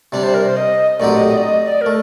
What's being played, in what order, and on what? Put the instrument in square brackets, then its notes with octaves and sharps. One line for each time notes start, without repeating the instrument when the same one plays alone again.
[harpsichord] C3 G3 D4 [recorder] D5
[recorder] C5
A#4
C5
D#5
[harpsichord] A#1 A2 F#3 C4 G4 [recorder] D5
[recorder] D#5
D#5
D5
D#5
D5
A#4
[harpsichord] A3